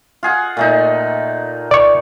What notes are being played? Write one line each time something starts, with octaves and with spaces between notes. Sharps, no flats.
F4 G#4 F#5
A#2 A3 D#4
D5 C#6